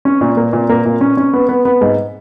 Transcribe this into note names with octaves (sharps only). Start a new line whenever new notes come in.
C#4
A#2
A#3
A#2
A#3
A#2
C#4
C#4
B3
B3
B3
G#2